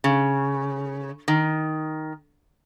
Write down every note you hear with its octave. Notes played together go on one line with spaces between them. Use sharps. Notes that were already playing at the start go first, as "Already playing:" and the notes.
C#3
D#3